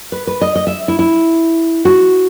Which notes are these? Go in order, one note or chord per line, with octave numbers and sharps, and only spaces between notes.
B4
B4
D#5
D#5
E5
E4
E4
F#4